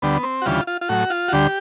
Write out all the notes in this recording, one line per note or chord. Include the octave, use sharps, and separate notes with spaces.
D2 D3 G3 B3
C4
F#4
D2 C#3 E3 G3 F4
F4
F4
A2 F#3 F#4
F4
F#4
D2 D3 G3 G4